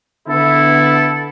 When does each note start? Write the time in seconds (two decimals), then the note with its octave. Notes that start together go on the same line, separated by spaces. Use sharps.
0.28 D3 B3 E4 A4